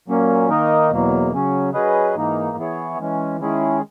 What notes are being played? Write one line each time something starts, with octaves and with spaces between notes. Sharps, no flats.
A#2 F#3 A#3 C#4
D#3 A#3 D#4 A#4 D#5
E2 B2 F#3 A#3
C#3 F#3 C#4
F#3 C#4 G#4 B4 D#5
G#2 E3 A#3 D#4
E3 B3 E4 G#4 C#5
E3 G#3 C#4
D#3 G#3 C#4 E4 G#4